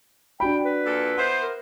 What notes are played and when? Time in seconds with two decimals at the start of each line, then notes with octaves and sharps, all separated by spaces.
0.40 D4 F#4 G5 B5
0.65 B4
0.86 A#2 A4
1.18 B3 E4 C5
1.42 A#4